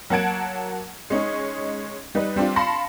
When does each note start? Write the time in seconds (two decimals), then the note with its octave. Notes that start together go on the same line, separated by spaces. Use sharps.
0.10 F#3 A#3 F#5 A5 G#6 D7
1.10 G#3 C#4 D#4
2.15 G3 D#4 B4
2.36 G3 C4 D4 F4
2.56 F5 A5 B5 C6 A#6 C#7